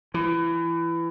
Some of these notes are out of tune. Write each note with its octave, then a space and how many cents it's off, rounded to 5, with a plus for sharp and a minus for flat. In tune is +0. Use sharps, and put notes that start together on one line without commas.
E3 +25